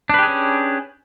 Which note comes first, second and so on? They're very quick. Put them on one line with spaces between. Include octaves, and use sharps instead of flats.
D4 B4 G4 G#4 C#4